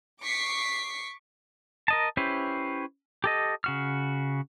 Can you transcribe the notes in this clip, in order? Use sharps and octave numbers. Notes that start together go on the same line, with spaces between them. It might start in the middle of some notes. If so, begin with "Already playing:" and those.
C#6 D6 B6 C7
A#4 D#5 A5
C#4 E4 G4 B4 C5
G4 A4 D#5
C#3 F#4 F6